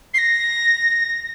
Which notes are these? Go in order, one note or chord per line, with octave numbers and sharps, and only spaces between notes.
C7
A#6